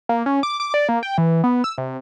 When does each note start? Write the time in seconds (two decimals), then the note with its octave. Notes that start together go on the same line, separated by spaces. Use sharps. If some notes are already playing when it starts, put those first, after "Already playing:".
0.09 A#3
0.26 C#4
0.43 D6
0.60 D6
0.74 D5
0.89 A#3
1.03 G5
1.18 E3
1.44 B3
1.64 E6
1.78 C3